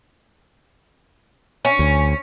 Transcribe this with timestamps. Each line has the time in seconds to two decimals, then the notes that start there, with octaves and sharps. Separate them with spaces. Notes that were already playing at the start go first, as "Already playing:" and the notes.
1.65 C#4
1.79 D2